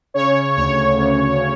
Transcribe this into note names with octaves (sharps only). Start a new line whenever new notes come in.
C#3 C#5
D2 C#5
D2
C#3